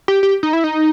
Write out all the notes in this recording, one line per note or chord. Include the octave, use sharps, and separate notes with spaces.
G4
G4
D#4
E4
D#4